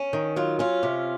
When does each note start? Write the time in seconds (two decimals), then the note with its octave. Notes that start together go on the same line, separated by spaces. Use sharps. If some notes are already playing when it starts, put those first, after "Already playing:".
Already playing: C#4
0.13 D#3
0.36 F#3 F4
0.59 C#4 F4
0.83 C3